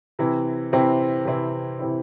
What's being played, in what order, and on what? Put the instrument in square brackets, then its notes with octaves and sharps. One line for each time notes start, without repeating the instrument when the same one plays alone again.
[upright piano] C3 E3 C4 E4
C3 E3 C4 E4
C3 E3 C4 E4
C3 E3 C4 E4